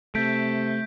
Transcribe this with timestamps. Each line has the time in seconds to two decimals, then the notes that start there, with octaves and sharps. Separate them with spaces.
0.15 C3 A3 G6 B6 D7